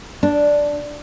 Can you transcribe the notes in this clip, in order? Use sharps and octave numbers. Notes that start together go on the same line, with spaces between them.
D4